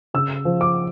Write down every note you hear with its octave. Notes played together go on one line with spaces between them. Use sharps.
C#3 E6
F3
D6